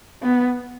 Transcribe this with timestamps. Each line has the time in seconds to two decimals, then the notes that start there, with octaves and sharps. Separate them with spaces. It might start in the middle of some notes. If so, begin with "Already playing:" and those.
0.22 B3